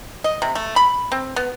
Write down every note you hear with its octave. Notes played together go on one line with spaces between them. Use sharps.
D#5
C3
A3
B5
C4
B3